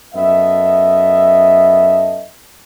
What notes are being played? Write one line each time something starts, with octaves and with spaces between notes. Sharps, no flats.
F#2 B3 A4 D#5 E5